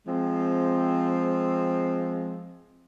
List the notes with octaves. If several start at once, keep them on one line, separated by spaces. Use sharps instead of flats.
F3 G#3 C4